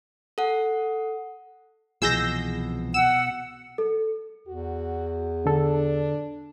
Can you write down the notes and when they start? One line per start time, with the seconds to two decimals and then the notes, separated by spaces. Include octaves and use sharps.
0.38 A4 F#5
2.02 C2 B2 E3 F3 G#4 E6 G6 A#6
2.94 F#5 E6
3.78 A4
4.47 E2 F#4
5.46 D3 D4 A4